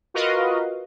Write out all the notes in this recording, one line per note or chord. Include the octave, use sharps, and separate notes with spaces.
F4 F#4 A#4 B4 D#5 F5